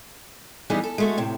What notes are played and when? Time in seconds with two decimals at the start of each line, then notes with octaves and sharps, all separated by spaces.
0.70 E3 G3 B3 D#4 G#4
0.83 A4
0.98 G#3 A3 F#4
1.18 A2 C3